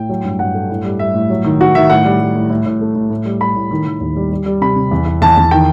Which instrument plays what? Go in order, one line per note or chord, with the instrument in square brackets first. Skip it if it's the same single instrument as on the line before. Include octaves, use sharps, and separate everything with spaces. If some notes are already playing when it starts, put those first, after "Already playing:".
Already playing: [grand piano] A2 G5
F#3
G2
G2 F#5
A3
A2
G3
G3 E5
A2
F#3
D#3
D#3 F#4
D#3 E5
A2 F#5
G3
G3
A2
A2
A2
A3
A2
A2
G3
G3 B5
A2
D#3
D#3
D#2
G3
G3
G3
C3 B5
C3
E2
E2
E2 A5
E2
D#3 G5